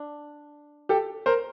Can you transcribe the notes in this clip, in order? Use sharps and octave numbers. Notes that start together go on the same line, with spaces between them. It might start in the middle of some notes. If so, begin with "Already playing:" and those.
Already playing: D4
G4 A4
A#4 C5